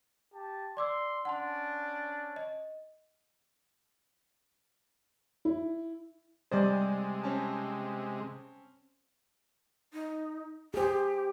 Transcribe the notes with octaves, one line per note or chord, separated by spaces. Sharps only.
G4 A5
D5 C6 D6 E6
C#4 D4 F#5 A5 C6
D#5
E4
C3 G3 G#3 C5 D5 D#5
C4 C#4 A5
D#4
G4 G#4 C5